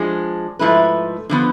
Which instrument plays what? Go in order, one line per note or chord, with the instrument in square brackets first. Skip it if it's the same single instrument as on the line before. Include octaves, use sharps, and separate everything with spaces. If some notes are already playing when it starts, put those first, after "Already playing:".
Already playing: [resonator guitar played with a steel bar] F3 G#3 D4
G#2 F3 A3 E4 B4
D3 F3 B3